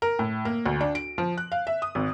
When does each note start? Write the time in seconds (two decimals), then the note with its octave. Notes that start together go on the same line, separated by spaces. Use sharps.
0.02 A#4
0.19 A2
0.45 A#3
0.66 D2
0.81 D4
0.95 D7
1.18 F3
1.38 F#6
1.52 F5
1.67 E5
1.82 D#6
1.95 G#1